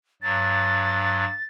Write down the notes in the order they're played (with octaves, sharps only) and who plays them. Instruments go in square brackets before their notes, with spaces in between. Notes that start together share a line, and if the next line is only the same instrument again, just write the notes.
[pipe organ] G2 F#3 [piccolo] A6